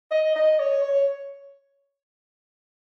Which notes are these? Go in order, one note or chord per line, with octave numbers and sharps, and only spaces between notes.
D#5
D#5
C#5
C#5